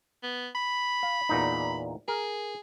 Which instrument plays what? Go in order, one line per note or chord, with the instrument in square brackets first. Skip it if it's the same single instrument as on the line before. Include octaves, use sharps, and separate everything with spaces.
[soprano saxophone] B3
B5
[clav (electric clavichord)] F5
E2 A#2 D#4
[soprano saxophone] G#4 [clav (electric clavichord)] A#4